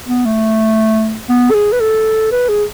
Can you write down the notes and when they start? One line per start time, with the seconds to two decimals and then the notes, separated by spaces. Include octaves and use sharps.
0.08 B3
0.25 A3
1.29 B3
1.51 A4
1.54 G#4
1.72 B4
1.81 A4
2.32 B4
2.49 G#4